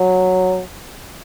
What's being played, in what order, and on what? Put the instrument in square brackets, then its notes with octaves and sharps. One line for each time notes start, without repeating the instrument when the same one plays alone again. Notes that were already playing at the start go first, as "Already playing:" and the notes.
Already playing: [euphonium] F#3